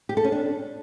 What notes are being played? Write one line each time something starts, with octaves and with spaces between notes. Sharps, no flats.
G4
A4
C#4
D4